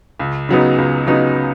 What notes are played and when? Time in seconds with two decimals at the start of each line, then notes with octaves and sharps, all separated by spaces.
0.19 C#2
0.49 C#3 F#3 B3 D#4
0.78 C#2
1.07 C#3 F#3 B3 D#4